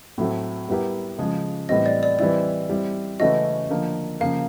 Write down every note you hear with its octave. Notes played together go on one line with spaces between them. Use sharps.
A2 F#3 A3 C4
G3 B3 E4 G4 A#4
C#3 F3 G#3
A2 E3 G3 C4 D#5
D5
D5
E3 G3 C4 E4 D5
G3 C4 E4
C#3 E3 A3 C#4 F#4 D#5
D3 F3 A#3
C#3 F3 A#3 F5